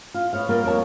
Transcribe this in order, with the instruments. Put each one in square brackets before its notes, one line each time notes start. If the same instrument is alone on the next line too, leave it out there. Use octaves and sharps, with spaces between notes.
[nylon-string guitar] F4
B3 C#5 F5
G3 A#3 B3 F4 A#4
F2 A#4 C#5 A5